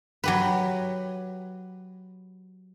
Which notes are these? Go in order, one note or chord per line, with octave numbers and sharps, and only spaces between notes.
F#3 G4 B4